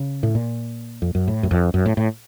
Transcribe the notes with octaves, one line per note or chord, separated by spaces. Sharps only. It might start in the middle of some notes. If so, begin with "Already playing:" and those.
Already playing: C#3
A2
A#2
F2
F#2
A2
F#2
F2
F#2
A2
A2